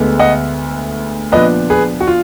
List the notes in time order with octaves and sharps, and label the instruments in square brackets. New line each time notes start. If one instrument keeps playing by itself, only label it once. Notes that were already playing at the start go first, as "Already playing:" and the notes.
Already playing: [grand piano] D2 D3 G#3 B3
[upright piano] D#5 F#5
[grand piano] A#2 F3 B3 D4 [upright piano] B4 D#5
[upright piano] G#4 B4
F#4
F4